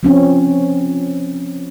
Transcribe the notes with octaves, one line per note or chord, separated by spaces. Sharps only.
F3 C4 C#4